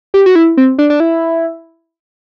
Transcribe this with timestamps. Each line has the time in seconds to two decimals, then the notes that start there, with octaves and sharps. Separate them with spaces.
0.14 G4
0.26 F#4
0.35 E4
0.57 C4
0.78 D4
0.90 D4
1.00 E4